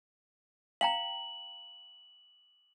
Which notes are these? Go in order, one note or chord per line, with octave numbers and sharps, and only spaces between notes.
F5 G5 A#5 F#7